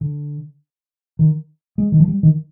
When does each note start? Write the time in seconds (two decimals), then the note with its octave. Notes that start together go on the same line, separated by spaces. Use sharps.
0.01 D3
1.19 D#3
1.78 G#3
1.92 D#3
2.00 F3
2.08 G3
2.23 D#3